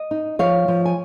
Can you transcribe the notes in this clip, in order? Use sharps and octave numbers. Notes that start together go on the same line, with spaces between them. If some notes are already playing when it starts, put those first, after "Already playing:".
Already playing: D#5
D#4
F3 C#5 F5
F3
G#5